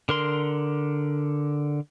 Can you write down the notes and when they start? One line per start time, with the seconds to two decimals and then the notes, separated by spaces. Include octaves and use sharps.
0.09 D3 A#4 C6